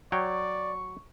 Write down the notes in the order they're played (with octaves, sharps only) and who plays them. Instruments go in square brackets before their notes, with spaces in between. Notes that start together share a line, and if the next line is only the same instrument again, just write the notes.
[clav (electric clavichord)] F#3 C#5 G5 [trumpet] D5 [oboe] C#6